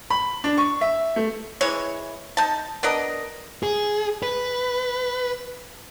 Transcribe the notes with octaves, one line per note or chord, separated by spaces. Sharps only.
B5
D4
C#6
E5
A3
E3 G#3 C#5
D#4 A5
B3 D4 A#4 D#5
G#4
B4